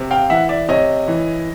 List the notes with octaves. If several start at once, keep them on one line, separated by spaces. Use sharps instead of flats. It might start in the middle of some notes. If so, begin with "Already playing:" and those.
Already playing: C3
F5 G5
E3 E5 F#5
D5 E5
C3 C#5 D#5
E3